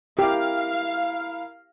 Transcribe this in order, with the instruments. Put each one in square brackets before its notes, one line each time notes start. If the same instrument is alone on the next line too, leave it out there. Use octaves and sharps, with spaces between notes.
[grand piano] E4 A#4 [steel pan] G4 [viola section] F5